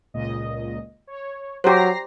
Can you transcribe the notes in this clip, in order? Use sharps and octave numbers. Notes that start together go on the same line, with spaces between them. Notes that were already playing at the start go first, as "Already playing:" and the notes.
C#2 A#2 D#5
C#5
F#3 G4 C5 A#5 A#6 C7